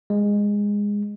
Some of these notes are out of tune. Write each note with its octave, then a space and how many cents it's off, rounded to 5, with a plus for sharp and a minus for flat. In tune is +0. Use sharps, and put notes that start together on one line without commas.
G#3 -15